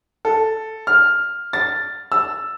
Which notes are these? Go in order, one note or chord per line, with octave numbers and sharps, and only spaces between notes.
A4
F6
A6
E6